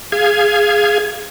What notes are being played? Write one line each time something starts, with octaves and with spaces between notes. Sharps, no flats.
G#4 F5 G#6